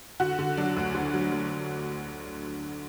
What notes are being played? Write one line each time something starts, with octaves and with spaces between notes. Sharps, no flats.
D3 F#4
D3
F#3 D4
D2
D3
F#3
F#3